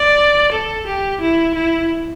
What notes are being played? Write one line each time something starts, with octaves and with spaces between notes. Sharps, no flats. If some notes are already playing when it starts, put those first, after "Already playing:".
Already playing: D5
A4
G4
E4
E4